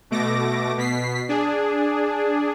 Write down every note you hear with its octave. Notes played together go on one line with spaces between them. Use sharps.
B2 A3 D6 A#6
B2 B6 C7
D4 G#4